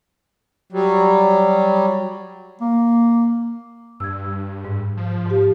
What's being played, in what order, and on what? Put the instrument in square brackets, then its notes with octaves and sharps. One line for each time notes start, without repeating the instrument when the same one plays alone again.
[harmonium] F#3 G3
[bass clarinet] A#3
[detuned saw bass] G2 [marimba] E6 G#6
[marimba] G#2
[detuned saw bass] F3
[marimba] G#2 G4